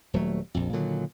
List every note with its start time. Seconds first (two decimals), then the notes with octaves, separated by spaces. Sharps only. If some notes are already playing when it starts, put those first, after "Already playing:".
0.14 D#1 F#3 A3
0.54 A#1 F2
0.73 A#2 D3 D#3 F#3